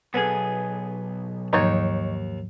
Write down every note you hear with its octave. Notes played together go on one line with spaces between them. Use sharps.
B1 B3 G#4 A4
D#2 G#2 F3 F#3 D#4 C#5